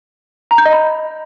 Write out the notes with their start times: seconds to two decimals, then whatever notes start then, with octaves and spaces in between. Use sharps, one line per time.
0.51 A#5
0.58 G6
0.65 D#5
0.73 B5